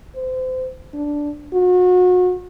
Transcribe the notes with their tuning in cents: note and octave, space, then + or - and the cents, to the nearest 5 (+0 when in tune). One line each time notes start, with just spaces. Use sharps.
C5 -30
D4 -5
F#4 -35